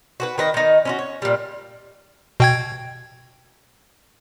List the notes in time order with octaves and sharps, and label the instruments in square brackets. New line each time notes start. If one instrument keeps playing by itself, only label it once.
[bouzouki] F#4 G4 B4
D#3 B4 D#5
D#3 D#4
C#4 E4 F#4
C#5
A#2 G3
[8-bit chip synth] B2 G5 G#6